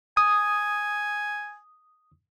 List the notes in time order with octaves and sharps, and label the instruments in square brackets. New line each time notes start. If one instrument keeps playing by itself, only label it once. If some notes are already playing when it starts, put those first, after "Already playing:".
[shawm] G#5 [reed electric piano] D#6